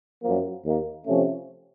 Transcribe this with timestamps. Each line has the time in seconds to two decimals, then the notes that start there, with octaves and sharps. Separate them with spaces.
0.23 F#2 F3 A#3
0.64 D#2 D#3 A#3
1.07 C3 F3 A3 C#4